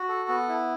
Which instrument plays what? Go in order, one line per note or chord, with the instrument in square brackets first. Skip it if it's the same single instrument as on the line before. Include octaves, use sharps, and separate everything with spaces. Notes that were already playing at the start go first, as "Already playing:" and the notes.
Already playing: [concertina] F#4
A4
B3
E4